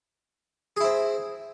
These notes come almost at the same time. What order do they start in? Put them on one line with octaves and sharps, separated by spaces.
G#4 E4 C4